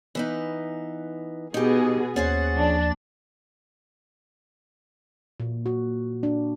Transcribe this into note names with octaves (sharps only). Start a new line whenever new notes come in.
E3 B3 D#4
B2 B3 D#4 G4 G#4
D#2 C#4 G#4 C5 F#5 A6
F3 D4
A#2
F#4
D4